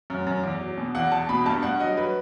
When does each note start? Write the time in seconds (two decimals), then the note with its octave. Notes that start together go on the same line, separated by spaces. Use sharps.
0.10 F#2
0.27 F#2
0.43 E2
0.61 F#3
0.77 B2
0.95 E2 F#5
1.12 E2 A5
1.29 B2 B5
1.46 G2 A5
1.62 G2 F#5
1.80 F#3 D#5
1.97 F#3 B4